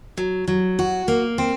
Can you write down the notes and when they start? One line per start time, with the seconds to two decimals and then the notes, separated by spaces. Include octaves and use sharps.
0.17 F#3
0.48 F#3
0.79 F#4
1.08 A#3
1.38 C4